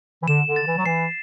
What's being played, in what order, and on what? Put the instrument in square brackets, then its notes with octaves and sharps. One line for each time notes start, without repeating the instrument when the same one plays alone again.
[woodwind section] E3
[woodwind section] D3 [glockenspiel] E7
[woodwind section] D3
[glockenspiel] A6
[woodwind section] E3
F#3
[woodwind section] E3 [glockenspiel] C7